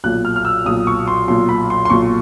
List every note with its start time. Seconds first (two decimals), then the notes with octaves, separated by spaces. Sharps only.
0.04 B1 A#2 F#6
0.25 F6
0.36 F6
0.45 E6
0.65 B1 A#2 D#6
0.87 C#6
1.08 C6
1.28 B1 A#2 C6
1.49 B5
1.70 C6
1.85 C6
1.90 B1 A#2 C#6